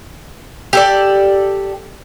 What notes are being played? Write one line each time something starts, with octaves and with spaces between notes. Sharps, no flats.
G4 A4 D5